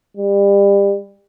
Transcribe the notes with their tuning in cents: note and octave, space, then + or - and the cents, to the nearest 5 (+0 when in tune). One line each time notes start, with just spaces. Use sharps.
G3 +30